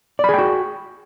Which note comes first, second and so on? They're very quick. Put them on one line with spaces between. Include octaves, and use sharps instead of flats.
D5 B5 G#4 G5 F#4